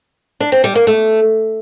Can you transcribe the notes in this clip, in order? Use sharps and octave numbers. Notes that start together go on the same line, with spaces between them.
D4
C4
G3
A#3
A3